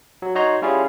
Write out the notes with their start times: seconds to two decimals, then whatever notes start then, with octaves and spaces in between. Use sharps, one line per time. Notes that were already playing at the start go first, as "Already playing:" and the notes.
0.22 F#3
0.35 D#4 F#4 C#5 A#5 C6
0.62 G3 C#4 E4 F4 G#4